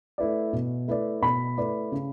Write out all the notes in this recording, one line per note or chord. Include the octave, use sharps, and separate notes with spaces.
A3 E4 B4 D5
B2
A3 E4 B4 D5
B2 B5
A3 E4 B4 D5
C#3